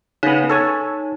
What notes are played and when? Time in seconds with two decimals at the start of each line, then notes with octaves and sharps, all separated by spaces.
0.23 C#3 B3 D#4
0.50 A4 C#5 G#5